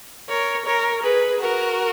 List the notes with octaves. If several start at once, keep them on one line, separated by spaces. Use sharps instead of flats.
A#4 C#5
A#4 C#5
G#4 B4
F#4 A#4